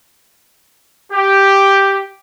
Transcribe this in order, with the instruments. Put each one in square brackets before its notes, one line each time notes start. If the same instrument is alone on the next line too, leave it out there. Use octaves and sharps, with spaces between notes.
[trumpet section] G4